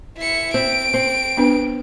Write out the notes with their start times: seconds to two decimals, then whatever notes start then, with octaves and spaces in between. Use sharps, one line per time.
0.18 E4 C#7
0.54 C4 D7
0.94 C4
1.37 B3 D4 B4